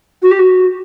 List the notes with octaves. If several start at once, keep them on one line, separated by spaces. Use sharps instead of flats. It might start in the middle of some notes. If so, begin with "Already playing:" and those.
F#4
G4
F#4